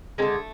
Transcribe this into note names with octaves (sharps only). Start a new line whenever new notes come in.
D3 G#3 A3 C#4